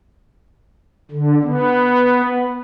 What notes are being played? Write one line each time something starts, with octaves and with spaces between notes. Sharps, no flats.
D3
B3